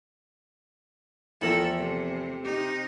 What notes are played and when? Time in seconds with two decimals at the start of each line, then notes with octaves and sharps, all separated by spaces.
1.41 E2 F3 A3 A4 A#4 G5 F#7
1.76 C3
2.44 C3 D#4 G4